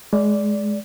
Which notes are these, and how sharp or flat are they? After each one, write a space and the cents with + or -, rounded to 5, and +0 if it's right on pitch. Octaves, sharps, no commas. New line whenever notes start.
G#3 +15 D5 -15